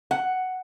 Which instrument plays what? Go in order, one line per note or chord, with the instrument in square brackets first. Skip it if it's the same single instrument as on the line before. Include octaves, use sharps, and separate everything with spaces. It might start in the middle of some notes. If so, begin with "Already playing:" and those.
[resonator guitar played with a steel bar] F#5